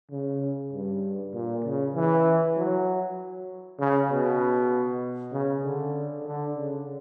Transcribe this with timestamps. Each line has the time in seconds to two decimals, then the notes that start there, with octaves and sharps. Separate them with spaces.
0.11 C#3
0.73 G2
1.34 A#2
1.65 C#3
1.95 E3
2.57 F#3
3.79 C#3
4.10 B2
5.33 C#3
5.63 D3
6.24 D3
6.55 C#3